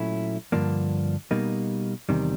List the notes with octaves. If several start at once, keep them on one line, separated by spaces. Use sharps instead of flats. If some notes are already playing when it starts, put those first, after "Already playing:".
Already playing: A#2 F#3 A3 C#4 E4
G2 D3 F3 A#3 D4
B2 G3 A#3 D#4
E2 C3 D#3 G3